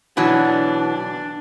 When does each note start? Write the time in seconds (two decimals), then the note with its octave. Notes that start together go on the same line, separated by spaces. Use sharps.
0.17 B2 E3 F#3 D4